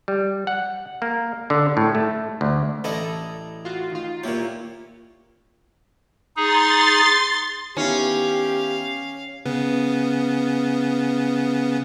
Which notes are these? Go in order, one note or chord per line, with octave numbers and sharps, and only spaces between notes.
G3
F#5
A#3
D3
A2
A3
D2
A1 E4 A4 D5 D#5
F4 F#4
D#3 F4
A#2 A#3 E4 G4 C#5
D#4 G#4 C6 A6
D#3 B3 C#4 E4 G4 F5
C#3 B3